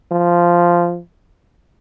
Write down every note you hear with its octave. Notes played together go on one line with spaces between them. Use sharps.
F3